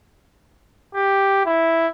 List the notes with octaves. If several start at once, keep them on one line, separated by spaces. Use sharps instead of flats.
G4
E4